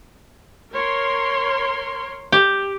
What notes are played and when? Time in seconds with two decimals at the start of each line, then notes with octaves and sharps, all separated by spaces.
0.73 A#4 C#5 C6
2.32 G4